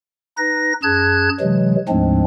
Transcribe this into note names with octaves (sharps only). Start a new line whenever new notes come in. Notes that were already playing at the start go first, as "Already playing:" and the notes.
D#4 B4 A#6
F#2 G#4 A5 F#6 G#6
C3 E3 F#3 G#3
D2 G#2 F3 G#3 C4 D4